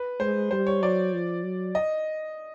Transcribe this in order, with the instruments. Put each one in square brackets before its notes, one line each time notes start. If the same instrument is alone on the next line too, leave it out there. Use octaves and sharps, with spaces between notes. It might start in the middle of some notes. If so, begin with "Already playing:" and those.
Already playing: [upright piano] B4
[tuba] G#3 [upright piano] C5
[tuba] G3 [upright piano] C5
[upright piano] C#5
[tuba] F#3 [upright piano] D5
[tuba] F3
F#3
[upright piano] D#5